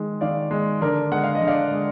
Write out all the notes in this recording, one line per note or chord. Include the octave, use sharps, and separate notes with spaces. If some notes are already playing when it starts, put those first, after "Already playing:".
Already playing: D#3 G#3
D#3 D5 F5
G#3
D3 A#4 D5
G#3 F#5
F5
D#5
D3
D5 F5
G#3